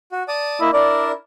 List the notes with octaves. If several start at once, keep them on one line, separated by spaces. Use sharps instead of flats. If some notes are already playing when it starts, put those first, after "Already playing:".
F#4
D5 A5 D#6
A#3 E4 D#5
D4 E4 A#4 D5